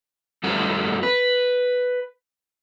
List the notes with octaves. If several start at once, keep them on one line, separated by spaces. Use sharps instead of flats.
F#2 G3 A3 C4 A4 F#5
B4